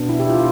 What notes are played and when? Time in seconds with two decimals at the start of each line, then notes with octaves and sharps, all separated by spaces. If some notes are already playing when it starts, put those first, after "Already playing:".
Already playing: B2 B3 D4
0.09 E4
0.20 G4
0.29 F4